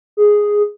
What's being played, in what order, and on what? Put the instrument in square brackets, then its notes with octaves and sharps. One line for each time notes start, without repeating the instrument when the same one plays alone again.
[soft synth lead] G#4